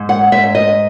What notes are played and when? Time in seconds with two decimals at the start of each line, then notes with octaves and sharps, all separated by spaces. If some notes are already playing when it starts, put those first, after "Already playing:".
Already playing: G#2
0.09 F#5
0.32 G#2 E5
0.55 D#5